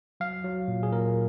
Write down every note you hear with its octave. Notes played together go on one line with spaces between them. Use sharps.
F#3 F5
F#3
A#2
G#4
A#2 A#4